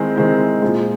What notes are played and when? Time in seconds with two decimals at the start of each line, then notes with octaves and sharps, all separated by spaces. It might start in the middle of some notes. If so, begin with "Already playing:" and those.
Already playing: D#3 G#3 C4 E4
0.16 D#3 G#3 C4 E4
0.62 A#2 F3 G#3